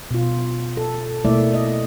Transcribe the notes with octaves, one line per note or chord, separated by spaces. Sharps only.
B2 F4
A4
B2 A3 A#3 E4 D5 E5
D#5